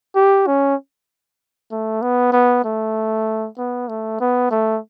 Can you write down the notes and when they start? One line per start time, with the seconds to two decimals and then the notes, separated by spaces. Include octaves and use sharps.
0.15 G4
0.47 C#4
1.72 A3
2.02 B3
2.33 B3
2.65 A3
3.58 B3
3.88 A3
4.20 B3
4.51 A3